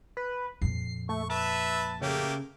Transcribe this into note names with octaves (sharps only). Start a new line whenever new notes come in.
B4
F2 A#2 C7
A3 C#6
B4 E5 A5
C#3 A3 A#3 G4